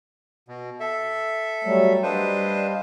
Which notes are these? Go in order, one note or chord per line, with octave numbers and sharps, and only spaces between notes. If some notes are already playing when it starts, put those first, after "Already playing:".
B2
A4 E5
F#3 G3 A3
G3 D4 B4 C5 D#5 F5